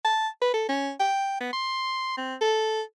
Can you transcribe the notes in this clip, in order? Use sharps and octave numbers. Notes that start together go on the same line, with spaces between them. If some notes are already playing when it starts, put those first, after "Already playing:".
A5
B4
A4
C#4
G5
B3
C6
C4
A4